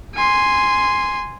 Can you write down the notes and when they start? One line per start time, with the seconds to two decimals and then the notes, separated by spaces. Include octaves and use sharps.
0.15 G#5 C6